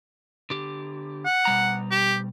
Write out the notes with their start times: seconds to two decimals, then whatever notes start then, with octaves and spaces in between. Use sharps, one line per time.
0.50 D3 G4
1.25 F#5
1.45 B2 G3 A#5
1.91 G4